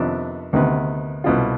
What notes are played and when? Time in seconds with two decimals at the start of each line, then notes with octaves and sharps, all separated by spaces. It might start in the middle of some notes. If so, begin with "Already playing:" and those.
Already playing: F2 C3 D#3 B3 D4
0.53 D2 C3 D#3 B3
1.24 C2 B2 B3 F4